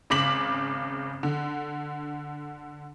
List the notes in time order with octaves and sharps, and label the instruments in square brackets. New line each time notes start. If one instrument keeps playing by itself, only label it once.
[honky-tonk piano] G#1 C#3 D6 B6 F#7
D3